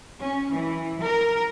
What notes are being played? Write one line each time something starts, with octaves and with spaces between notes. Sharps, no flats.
C#4
E3
A#4